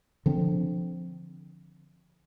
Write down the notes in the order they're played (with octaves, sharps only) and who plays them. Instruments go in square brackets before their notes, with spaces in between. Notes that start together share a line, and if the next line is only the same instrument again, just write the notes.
[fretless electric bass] D3 F3 C4 D4